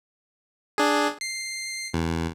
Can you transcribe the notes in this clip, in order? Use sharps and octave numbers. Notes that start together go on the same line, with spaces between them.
D4 G#4
C7
E2